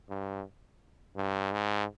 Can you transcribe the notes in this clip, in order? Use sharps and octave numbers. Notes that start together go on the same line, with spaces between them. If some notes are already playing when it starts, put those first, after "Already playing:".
G2
G2
G#2